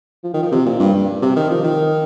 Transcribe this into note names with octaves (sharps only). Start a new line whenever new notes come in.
F3
D#3
F3
C3
A#2
G2
G2
C3
D#3
F3
D#3